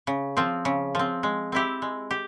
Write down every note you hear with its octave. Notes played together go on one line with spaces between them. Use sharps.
C#3
F3 C4
C#3
F3 C4
G#3
C4 E4 G4
G#3
G4